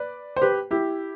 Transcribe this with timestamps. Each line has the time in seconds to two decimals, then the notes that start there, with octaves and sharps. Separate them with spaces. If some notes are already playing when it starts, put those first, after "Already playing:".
Already playing: B4 D5
0.36 C5
0.42 G4 B4
0.71 E4 G4